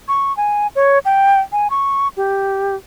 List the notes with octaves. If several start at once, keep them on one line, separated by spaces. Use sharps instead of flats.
C#6
G#5
C#5
G5
G#5
C#6
G4